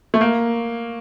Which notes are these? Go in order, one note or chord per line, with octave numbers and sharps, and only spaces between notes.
A3
A#3